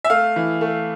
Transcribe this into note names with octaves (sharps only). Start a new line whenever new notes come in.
E5
A3 F5
E3
A3